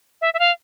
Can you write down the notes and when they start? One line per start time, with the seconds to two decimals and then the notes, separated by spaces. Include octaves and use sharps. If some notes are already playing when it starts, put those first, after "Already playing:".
0.21 E5
0.34 E5
0.39 F5